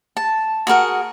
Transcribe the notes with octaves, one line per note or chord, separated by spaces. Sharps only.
A5
F#4 G#4 A#4 F#5